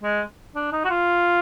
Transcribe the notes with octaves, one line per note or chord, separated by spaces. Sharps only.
G#3
D4
D#4
F#4
F4